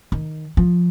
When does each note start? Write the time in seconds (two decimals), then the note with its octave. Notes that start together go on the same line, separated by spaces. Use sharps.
0.12 D#3
0.57 F3